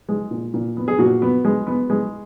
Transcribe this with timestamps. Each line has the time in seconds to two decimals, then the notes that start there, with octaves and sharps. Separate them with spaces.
0.09 G#3
0.31 A#2
0.54 A#2
0.77 B3
0.88 G#4
0.98 A#2 F#4
1.22 B3
1.45 G#3
1.67 B3
1.90 G#3